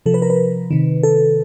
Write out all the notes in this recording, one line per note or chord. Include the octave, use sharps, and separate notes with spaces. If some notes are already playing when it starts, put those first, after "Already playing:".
C3 F3 A4
B4
A#4
B4
C3 D#3
A4